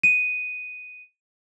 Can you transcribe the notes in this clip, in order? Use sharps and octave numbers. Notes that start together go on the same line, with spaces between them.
D#7